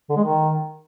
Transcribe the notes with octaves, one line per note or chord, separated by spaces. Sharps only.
D3
G#3
D#3